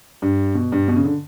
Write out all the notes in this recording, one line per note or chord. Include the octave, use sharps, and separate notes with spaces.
G2
B2
G2
B2
C#3
D3